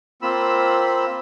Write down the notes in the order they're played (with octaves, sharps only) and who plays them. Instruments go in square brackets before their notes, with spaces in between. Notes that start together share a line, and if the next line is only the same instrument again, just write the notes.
[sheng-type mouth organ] A#3 C4 F4 B5 E6